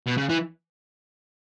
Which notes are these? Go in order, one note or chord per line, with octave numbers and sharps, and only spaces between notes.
B2
C#3
E3